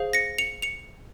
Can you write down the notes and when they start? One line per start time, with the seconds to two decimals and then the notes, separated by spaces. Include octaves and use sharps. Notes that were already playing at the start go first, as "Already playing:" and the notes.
Already playing: G#4 C5 F5
0.13 A#6 C#7
0.38 C#7 F7
0.62 C#7 F7